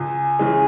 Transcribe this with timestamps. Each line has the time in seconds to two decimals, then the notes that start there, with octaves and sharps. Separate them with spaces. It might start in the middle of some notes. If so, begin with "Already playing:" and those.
Already playing: C#2 G#5
0.39 C#3 E3 G#3